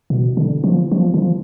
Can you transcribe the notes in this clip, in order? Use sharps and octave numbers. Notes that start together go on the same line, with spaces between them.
B2
D3
F3
F3
D3
F3